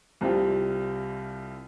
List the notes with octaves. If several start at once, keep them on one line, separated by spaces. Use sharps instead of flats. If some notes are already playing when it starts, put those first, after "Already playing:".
C2 C3 G3 C4 F4